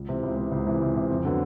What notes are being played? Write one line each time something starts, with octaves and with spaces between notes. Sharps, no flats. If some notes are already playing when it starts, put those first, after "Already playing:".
Already playing: C#2
C3 E3
C#2
C3 E3
C#2
C3 E3
C#2
C3 E3
F2
D3 F#3 B3